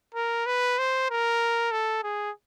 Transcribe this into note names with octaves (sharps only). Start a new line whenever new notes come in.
A#4
B4
C5
A#4
A4
G#4